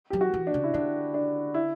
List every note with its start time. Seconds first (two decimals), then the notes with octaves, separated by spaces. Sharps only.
0.10 F#3 G4
0.21 F#4
0.34 E3
0.47 D4
0.54 C#3
0.64 E4
0.74 D3 D4
1.14 D4
1.54 E4